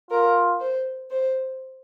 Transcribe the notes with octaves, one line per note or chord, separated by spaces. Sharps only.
F4 A#4
C5
C5